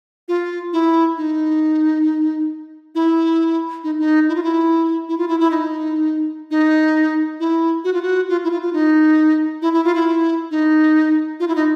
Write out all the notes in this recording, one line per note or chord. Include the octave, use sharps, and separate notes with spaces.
F4
E4
D#4
E4
D#4
D#4
E4
F4
E4
E4
F4
E4
E4
D#4
D#4
E4
F#4
F4
F#4
F4
E4
F4
F4
D#4
E4
E4
F4
E4
D#4
F4
E4
D#4